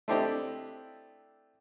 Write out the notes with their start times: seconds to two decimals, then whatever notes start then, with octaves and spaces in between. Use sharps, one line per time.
0.08 A3 C4 D4 E4 G4 D#5